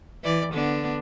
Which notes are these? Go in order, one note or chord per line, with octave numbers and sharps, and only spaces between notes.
E3 D5
D3 B3 D4